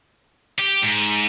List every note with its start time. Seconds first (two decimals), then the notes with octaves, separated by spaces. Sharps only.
0.59 G4
0.82 G#2